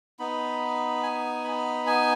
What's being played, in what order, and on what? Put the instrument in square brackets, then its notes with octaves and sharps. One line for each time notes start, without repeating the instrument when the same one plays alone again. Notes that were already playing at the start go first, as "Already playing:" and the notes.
[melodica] B3 D#4 B5
G#5
B5
G#5